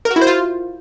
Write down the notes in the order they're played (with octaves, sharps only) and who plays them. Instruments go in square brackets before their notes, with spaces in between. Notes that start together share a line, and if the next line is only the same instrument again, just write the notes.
[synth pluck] A#4
F#4
E4
C5
F4